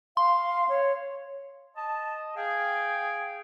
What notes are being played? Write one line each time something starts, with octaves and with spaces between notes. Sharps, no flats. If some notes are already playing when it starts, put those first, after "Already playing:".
F5 C6
C#5
D#5 A5
G#4 F5 G5